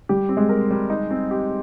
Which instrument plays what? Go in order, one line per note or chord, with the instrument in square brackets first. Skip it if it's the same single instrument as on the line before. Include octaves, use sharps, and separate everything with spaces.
[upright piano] G3 [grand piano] G4
[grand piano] C4
[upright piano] G#3
[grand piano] A#4
G3
D#4
C4
G4